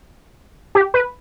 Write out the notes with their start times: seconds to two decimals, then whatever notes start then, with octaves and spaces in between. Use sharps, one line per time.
0.75 G4
0.94 B4